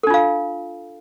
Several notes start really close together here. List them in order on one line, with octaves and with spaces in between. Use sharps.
A4 D4 F4 F5